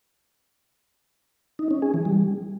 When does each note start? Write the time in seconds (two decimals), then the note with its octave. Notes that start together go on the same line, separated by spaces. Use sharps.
1.59 D#4
1.71 C#4
1.82 G#4
1.94 E3
2.05 G3